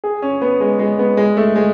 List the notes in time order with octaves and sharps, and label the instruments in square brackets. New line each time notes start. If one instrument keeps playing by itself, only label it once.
[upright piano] G#4
C#4
B3
G#3
G#3
B3
G#3
A3
G#3